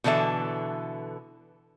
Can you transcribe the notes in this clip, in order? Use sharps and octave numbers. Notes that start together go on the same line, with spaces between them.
B2 D3 E3 A4 E5